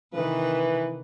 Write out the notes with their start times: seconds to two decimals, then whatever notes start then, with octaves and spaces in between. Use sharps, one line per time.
0.14 C3 D#3 E3 B4